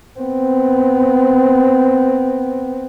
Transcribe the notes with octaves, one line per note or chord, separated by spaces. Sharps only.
B3 C4